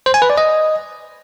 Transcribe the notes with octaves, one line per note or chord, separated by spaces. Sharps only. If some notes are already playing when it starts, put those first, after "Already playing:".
C5
G#5
B4
D5
D#5